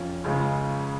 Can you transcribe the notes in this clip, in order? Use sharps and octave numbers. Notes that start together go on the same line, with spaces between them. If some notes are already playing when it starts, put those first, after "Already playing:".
Already playing: F2 F3 C#4 F4
C#2 C#3 G#3 F4